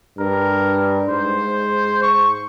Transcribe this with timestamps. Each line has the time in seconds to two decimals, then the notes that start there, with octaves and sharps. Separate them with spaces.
0.19 G2 A#4
1.08 G#2 C5
2.02 C#6